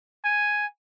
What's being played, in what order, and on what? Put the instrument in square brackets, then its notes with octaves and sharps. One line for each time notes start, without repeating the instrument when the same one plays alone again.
[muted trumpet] G#5